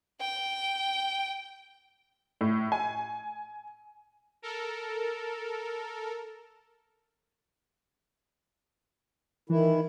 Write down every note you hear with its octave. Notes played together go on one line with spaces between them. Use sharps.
G5
A2
G#5
A4 A#4
D#3 E3 E4